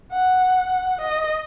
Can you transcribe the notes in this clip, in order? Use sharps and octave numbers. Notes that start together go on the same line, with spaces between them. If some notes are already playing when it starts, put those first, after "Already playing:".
F#5
D#5